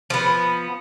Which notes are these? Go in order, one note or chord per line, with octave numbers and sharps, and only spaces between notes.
F3 B3